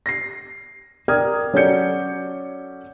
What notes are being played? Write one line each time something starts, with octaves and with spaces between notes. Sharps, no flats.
A#6 C7
A#4 D5 G5 D#6 F6 G#6
F#3 C#4 A4 D5 G6 C#7